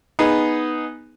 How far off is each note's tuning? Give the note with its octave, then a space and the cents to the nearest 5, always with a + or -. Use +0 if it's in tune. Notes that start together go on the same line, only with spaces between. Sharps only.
B3 +0 D#4 +0 G#4 +0